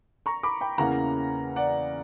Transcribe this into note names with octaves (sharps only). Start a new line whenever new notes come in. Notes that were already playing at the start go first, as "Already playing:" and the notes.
A#5 C#6
B5 D6
G5 B5
E2 C#3 E3 A#3 C#4 F#5 A#5
D5 F#5